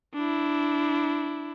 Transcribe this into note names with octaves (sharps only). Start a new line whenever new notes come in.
D4 E4